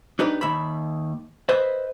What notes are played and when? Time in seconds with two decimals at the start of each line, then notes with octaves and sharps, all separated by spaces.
0.19 D4 D#4 G4 B4
0.41 D#2 E5 B5
1.49 B4 C5 D#5 E5